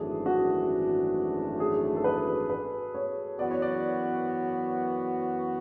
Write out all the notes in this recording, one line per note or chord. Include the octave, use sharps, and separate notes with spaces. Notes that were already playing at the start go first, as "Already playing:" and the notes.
Already playing: G#1 F#2 E3 A3 D4 G#4
F#4
G#4
A4
B4
B4
C#5
F#2 E3 B3 F#4 D5
C#5
D5